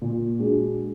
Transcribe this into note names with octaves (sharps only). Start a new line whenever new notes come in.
A#2
G#3 D4 F#4